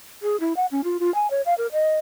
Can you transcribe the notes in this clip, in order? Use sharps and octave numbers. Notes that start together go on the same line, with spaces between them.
G#4
E4
F#5
C#4
F4
F4
G#5
C#5
F5
A#4
D#5